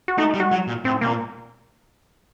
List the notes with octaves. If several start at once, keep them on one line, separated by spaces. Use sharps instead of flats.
F#4
A3 D#4
G3
F#4
F#3
A#2
A2 C4
C3 A#3
A#2